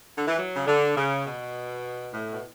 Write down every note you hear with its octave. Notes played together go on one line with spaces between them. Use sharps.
D3
E3
F#3
C#3
D3
C#3
B2
A2
B2